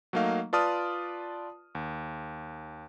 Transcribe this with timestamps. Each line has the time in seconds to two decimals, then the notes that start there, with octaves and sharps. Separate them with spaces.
0.13 F#3 A3 A#3 D#4 F5
0.53 F4 B4 D5 A5 D#6 F6
1.75 D#2